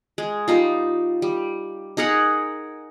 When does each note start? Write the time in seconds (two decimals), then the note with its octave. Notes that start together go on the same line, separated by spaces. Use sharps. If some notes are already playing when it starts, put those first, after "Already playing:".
0.18 G#3
0.48 G3 D#4 F4
1.22 G3
1.97 D#4 G#4 A#4 F#5